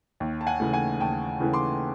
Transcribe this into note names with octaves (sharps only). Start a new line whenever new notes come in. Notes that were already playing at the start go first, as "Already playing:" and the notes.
D#2
A5
F#5 G#5
C#3 E3 A3
F#5 G#5
D#2 G5 A5
C#3 E3 A3
C6 D6